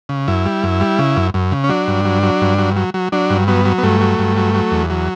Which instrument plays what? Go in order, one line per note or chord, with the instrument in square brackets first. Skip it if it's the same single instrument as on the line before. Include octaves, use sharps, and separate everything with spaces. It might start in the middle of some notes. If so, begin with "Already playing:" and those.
[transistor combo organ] C#3
F#2 E4
G3
F#2
G3
C#3
F#2
F#2
C#3
C#4
F#3 D4
G2
F#3
F#3
G2
F#3
F#3
F#3
F#3 D4
G2
F#3 B3
F#3
B3
G2 A3
F#3
G2
F#3
F#3
E2
F#3